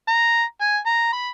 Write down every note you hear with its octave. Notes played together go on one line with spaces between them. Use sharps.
A#5
G#5
A#5
B5